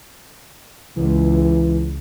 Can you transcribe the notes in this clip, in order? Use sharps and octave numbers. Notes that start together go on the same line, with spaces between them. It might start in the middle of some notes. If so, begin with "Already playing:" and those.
C#2 E3